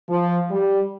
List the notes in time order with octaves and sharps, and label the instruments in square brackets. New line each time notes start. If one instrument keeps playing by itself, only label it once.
[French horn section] F3
G3